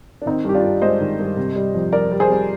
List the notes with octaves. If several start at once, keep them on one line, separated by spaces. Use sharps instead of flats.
D4
D#3 C4 D#4
G2 G4
D4 F4
G2
G#3 C5 D#5
D#3
G2
C3
G3
F2
G3 A#4 D5
G3
G#4 C5
G3